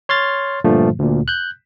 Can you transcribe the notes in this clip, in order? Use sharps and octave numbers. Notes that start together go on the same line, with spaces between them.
C#5 C6 F6 A6
G2 A#2 D3 F3 A3
D2 A#2
F#6 G6